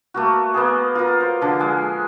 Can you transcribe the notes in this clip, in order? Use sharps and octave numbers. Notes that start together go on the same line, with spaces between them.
A3 A#3 F#4
A#3 B3 G#4
F4 A#4
C5
D3 F3
G#3 G#5